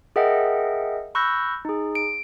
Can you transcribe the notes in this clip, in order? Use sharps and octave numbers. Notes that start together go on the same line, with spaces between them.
G#4 A#4 D#5 E5 F#5 G5
B5 C#6 E6 F#6 G6 A#6
D#4 G#4
D7